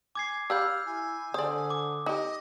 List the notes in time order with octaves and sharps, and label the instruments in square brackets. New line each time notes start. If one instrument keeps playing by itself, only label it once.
[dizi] G#5 [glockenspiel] D6 G#6 C7
[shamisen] G4 F5 B5 [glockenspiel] E6 G6 [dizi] F6
[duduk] E4 [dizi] G#5
[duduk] D3 [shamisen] C5 D5 [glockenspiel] D#6
[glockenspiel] D6
[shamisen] D#4 G4 [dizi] D#5